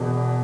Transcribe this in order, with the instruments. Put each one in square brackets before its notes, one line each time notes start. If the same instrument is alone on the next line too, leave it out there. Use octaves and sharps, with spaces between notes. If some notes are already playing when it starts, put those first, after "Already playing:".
Already playing: [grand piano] E1 E2 B2